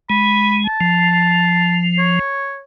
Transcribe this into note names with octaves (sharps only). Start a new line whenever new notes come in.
G#3 B5
A5
F3
C#5